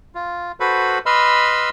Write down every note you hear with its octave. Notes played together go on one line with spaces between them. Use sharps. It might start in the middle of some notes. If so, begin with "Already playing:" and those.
F4
F#4 A4 B4 C5 B5
B4 D#5 B5 C6 E6 F6